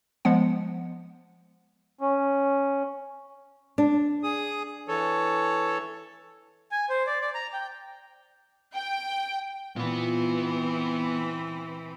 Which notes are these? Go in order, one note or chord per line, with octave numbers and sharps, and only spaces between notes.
F3 G#3 B3 F#5
C#4
D4
G#4 D#6
E3 A4 C#5
G#5
C5
D5
D5
A#5
G5
G5
A#2 E3 B3 C4 F#5